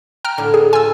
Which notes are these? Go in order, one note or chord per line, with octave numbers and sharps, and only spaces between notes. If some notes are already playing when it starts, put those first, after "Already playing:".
G5 A#5 F6
A2 D3
G#4
F4 G#5 E6